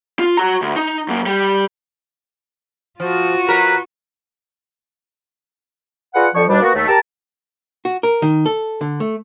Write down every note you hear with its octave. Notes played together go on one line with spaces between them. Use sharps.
F4
F#4 A#5
D2
D#4
F#2 A#3
G3
F3 F4 F#4
F#3 A#4 B4
F4 G#4 B4 D5 F#5
F2 D3 F3 C#6
D#2 B2 G3 D4
A#3 B3 F#4
D#2 A3
G4 A#4 A5
F#4
A#4
D#3
A4
D3
A3